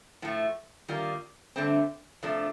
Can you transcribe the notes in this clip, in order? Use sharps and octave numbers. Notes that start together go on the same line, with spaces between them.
A2 F3 A3
D#3 G3 A#3 F4
G2 D3 A3 C4
C3 F3 A3 D4 A4